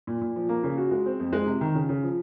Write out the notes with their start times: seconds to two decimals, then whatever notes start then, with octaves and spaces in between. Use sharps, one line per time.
0.07 A#2
0.21 A#2
0.36 F3
0.49 A#3
0.64 C#3
0.78 F#4
0.91 G#3
1.06 C4
1.20 F2
1.33 G#3
1.46 C3
1.61 D#3
1.75 C#3
1.89 C#3
2.03 F3